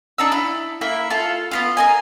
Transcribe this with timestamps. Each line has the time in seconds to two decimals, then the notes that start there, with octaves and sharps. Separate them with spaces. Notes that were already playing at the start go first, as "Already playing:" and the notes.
0.18 D4 D#4 E6
0.32 E4
0.81 A#3 E4 E5
1.10 F4 A4
1.51 B3 C#4 F4
1.77 A#4 D#5 G#5